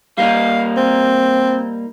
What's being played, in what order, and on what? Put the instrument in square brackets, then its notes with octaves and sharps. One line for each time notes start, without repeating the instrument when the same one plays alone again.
[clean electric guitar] G3 A#3 D#4 [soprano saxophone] F5
[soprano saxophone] C4